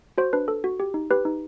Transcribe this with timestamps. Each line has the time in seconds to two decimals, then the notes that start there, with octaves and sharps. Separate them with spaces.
0.18 F#4 C5
0.33 D4 B4
0.48 A4
0.64 F#4
0.80 G4
0.94 D#4
1.11 G4 B4
1.25 D#4